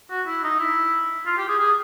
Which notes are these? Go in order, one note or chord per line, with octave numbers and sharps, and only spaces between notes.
F#4
E4
D#4
E4
F4
G4
G#4
G#4